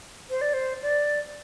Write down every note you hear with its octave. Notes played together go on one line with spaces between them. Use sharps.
C5
D5
C5
D5